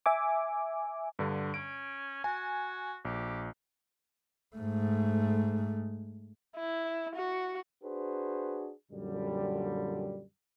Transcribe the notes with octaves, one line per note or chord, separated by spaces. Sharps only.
E5 G#5 D6
G2 D3
C#4 D7
F#4 G#5
A#1 G4
G#2 A3
E4
F#4
D4 F#4 G#4 B4 C5
F#2 A#2 D3 G3